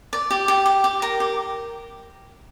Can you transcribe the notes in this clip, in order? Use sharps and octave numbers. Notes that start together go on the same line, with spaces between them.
D5
G4
G4
G4
G4
A#4
G4